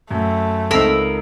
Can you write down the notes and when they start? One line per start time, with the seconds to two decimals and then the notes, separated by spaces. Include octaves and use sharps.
0.11 F#2 A3
0.71 C#2 C4 D#4 A4 A#4 B5 E6 C7